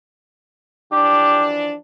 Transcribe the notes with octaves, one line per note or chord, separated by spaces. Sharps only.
E3 F3 D4 G4